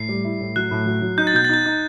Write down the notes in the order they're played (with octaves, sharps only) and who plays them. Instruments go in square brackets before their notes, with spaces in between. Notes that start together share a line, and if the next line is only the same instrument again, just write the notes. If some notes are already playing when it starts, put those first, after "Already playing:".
Already playing: [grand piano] A2 [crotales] C7
[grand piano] G3
E4
A2
[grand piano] F#3 [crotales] F#6
[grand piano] A2
F#3
F#3
[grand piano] D#4 [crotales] G6
[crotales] A6
[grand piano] B2 [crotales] G6
[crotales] A6
[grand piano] D#4 [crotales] G6
[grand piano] D#4